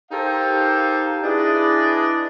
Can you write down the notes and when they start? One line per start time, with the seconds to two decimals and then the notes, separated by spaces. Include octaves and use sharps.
0.12 D#4 G4 A4 A#4 C5 F5
1.23 D4 E4 G#4 B4 D5 D#5